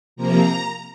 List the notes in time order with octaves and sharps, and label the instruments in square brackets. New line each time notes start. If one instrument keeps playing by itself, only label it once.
[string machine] C3 F3 A#3 A#5